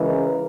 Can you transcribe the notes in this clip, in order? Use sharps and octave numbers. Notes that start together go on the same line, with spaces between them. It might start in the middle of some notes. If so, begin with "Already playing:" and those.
Already playing: C#3 E3 G#3 A#4